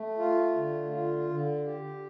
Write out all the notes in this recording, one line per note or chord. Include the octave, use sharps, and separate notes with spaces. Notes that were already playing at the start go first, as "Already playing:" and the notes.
Already playing: A3
F4
D3
F4
D3
G4